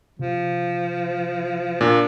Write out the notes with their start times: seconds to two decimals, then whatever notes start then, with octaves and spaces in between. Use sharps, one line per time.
0.19 C3 F3
1.81 A#2 D4